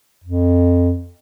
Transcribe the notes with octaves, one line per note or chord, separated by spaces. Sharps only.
F2